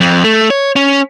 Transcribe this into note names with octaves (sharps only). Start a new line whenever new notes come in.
F2
A3
C#5
C#4